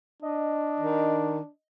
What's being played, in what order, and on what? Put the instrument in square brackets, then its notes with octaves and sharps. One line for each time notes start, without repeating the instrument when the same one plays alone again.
[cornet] D4 [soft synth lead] D#5
[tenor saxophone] D#3